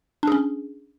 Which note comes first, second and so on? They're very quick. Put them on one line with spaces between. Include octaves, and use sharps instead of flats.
D4 G#4 C#4